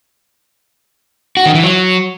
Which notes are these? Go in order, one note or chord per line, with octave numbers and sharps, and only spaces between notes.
F#4
D#3
E3
F#3